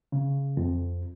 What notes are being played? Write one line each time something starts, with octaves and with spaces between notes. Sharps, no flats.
C#3
F2